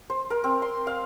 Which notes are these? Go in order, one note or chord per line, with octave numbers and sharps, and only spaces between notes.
C5
A#4
C4
C6
F5